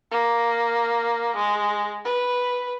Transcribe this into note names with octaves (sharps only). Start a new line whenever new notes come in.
A#3
G#3
B4